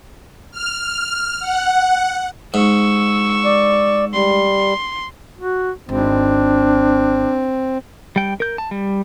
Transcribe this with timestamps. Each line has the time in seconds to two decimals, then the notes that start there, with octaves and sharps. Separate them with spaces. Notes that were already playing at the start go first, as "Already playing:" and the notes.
0.51 F6
1.39 F#5
2.54 G#2 C#6 E6
3.45 D5
4.14 G3 C6
5.39 F#4
5.89 G#1 C4 D4
8.16 G3 G5
8.40 A#4 G6
8.58 A5
8.71 G3